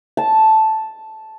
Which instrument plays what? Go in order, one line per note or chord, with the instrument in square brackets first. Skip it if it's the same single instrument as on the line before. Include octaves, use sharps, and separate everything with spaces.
[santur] A5